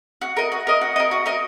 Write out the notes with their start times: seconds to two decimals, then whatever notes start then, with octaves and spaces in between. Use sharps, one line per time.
0.21 F#4
0.37 A#4 D#5
0.52 F#4
0.67 A#4 D#5
0.81 F#4
0.96 A#4 D#5
1.11 F#4
1.26 A#4 D#5